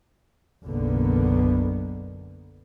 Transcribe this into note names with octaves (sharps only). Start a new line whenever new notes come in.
F#1 B1 B2 D3 A#3 B3